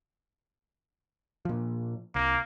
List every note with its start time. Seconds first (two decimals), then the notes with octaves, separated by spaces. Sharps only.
1.45 A#2 F3
2.15 C2 A#3